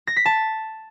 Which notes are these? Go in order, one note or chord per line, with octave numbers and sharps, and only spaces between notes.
A#6
B6
A5